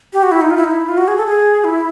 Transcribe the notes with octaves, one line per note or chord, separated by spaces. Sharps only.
G4
F#4
E4
D#4
F4
E4
D#4
E4
F4
F#4
G#4
A4
G#4
E4